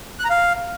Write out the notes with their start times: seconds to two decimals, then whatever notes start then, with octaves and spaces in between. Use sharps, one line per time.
0.19 F#6
0.25 A#5
0.30 F5